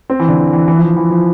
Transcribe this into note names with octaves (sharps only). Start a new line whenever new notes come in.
C4
E3
D3
E3
E3
E3
F3
E3
E3
F3